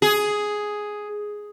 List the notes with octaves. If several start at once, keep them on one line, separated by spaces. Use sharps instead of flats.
G#4